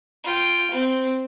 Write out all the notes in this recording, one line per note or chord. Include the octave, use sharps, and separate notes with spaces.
F4 G5
C4